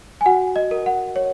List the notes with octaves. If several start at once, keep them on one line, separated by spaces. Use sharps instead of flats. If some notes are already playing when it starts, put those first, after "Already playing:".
G#5
F#4 F#5
D#5
A#4
F#5
C#5